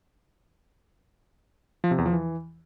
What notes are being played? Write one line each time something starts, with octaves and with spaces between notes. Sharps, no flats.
F3
C3
E2
F3
E3